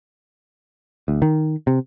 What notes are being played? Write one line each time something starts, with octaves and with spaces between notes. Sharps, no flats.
D2
D#3
C3